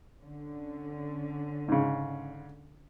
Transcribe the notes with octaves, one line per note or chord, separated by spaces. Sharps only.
D3 C#4
G#2 C#3